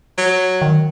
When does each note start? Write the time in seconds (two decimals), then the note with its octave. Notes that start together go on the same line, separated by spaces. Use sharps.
0.18 F#3
0.62 D#3